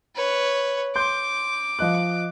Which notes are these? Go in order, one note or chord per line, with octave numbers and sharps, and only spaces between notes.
B4 C#5
C6 D6 G6
F3 D#5 F#6